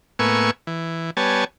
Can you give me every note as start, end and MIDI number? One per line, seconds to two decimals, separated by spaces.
0.19 0.51 45
0.19 0.51 58
0.19 0.51 59
0.19 0.51 80
0.19 0.51 85
0.19 0.51 88
0.67 1.10 52
1.17 1.44 55
1.17 1.44 59
1.17 1.44 73
1.17 1.44 80
1.17 1.44 81